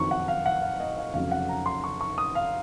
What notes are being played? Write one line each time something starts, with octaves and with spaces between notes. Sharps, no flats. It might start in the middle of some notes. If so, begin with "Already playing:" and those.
Already playing: F#1 F2 D#3 F#3 C#6
F#5
F5
F#5
F5
D#5
F5
F1 F2 C#3 F#3 F5
F#5
A#5
C6
C#6
C#6
D#6
F5